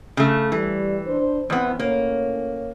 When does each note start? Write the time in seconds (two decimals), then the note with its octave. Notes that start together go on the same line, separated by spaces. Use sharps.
0.17 C#3 A3
0.52 E3 G3
1.06 D4 C5
1.50 E2 E3 B3 C4
1.80 A2 A#3 C#4 C#5